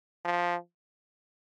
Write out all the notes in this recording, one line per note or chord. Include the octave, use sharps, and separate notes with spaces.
F3